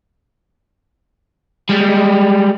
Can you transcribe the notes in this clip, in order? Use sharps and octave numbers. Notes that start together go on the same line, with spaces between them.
G3 G#3